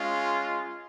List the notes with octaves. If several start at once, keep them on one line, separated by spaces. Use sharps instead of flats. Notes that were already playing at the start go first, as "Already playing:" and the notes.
Already playing: G#3 C#4 F4